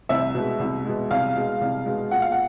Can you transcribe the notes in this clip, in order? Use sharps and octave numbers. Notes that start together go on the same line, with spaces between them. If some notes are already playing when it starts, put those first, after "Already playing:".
C2 E5
B2 G#3
C2
B2 G#3
C2 F5
B2 G#3
C2
B2 G#3
A#2 F#5
F5
F#5